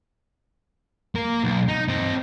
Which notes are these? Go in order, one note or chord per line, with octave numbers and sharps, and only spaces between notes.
A#3 A#4
B1
D#4
C4 D#5